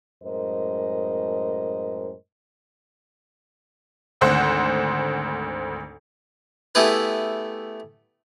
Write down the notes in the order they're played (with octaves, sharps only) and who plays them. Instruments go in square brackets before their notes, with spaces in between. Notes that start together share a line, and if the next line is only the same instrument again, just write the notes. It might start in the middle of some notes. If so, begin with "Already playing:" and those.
[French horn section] F#2 A2 G#3 A#4 C5 D#5
[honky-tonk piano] G#1 D2 C5 F#5
[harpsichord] A3 B3 E4 G4 G#4 B4